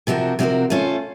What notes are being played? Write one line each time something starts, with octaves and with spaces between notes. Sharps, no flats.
C3 F3 C4 F#4 A#4
C3 F3 C4 F#4 A#4
A3 C#4 F4 C5